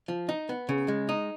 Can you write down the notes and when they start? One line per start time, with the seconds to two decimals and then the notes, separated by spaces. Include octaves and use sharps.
0.08 F3
0.29 D#4
0.49 B3
0.69 C#3
0.88 G#3
1.09 D#4